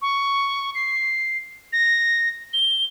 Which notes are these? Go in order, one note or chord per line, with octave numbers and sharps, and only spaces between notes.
C#6
C7
A#6
G7